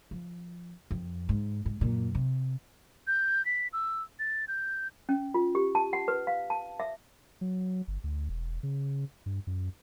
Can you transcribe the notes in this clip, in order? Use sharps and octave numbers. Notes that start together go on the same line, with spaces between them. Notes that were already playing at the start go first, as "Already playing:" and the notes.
F3
F2
G#2
G#2
F#2 A#2
C3
G6
B6
E6
A6
G6
C#4
F4
G4
A5
F#5
B4
F5
A5
E5
F#3
G1
D2
E1
C#3
G2
F#2